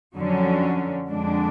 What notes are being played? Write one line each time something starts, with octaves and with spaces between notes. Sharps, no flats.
F2 D3 F#3 C#4
F2 D3 G#3 D4